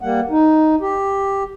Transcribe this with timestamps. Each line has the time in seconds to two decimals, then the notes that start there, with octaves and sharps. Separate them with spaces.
0.01 G3 A#3 F#5
0.30 D#4
0.81 G4